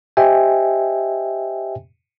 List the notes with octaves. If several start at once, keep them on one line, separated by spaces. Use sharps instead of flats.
G4 C5 D#5 E5 G5 G#5